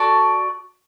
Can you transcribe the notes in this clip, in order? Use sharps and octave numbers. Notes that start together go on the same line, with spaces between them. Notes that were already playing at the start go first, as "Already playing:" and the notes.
Already playing: F#4 A4 D5 A5